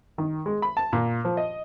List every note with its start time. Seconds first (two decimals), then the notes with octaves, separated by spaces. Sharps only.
0.18 D#3
0.46 G#3
0.62 B5
0.77 A5
0.93 A#2
1.25 F3
1.37 D#5